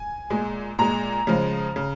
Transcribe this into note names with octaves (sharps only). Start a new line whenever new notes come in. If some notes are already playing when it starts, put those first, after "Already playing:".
Already playing: G#5
A#2 G#3
A#2 G#3 A#5
C#3 F3 G#3
C#3